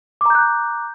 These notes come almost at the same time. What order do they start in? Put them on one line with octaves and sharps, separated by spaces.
D6 A#5 G6 F#6